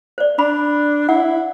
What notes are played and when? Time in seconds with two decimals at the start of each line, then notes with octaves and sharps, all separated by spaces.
0.18 C5 D5
0.39 D4 B5
1.09 E4 F#5